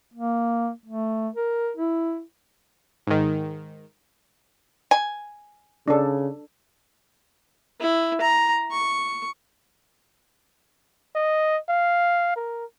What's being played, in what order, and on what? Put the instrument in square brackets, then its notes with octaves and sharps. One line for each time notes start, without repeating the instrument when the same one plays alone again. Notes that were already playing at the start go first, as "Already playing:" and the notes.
[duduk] A#3
A3
A#4
E4
[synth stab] G#2 D#3
[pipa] G#5
[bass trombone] C#3 [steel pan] D4 A4
[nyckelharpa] E4
A#5
C#6
[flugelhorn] D#5
F5
A#4